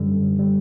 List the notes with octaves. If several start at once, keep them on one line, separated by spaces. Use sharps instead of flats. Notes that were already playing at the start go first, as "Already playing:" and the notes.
Already playing: F#2 D3 G3
D3 G3